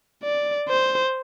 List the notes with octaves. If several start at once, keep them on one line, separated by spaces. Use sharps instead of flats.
D5
C5